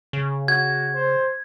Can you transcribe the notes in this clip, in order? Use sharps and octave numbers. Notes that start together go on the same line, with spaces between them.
C#3
F#4 G#6
C5